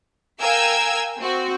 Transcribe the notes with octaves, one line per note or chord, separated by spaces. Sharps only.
A#4 F5 G5 G#5 E6 G#6
C4 F#4